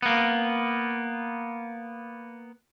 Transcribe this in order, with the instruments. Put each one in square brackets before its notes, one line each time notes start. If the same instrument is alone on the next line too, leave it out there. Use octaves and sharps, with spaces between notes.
[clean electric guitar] A#3 B3